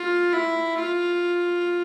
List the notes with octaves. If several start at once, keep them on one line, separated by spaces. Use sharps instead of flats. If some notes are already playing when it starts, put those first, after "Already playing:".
Already playing: F4
E4
F4